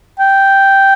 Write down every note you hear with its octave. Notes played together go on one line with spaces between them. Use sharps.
G5